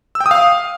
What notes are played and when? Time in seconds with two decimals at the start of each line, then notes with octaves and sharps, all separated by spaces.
0.15 E6
0.20 G5
0.26 D#6
0.31 F5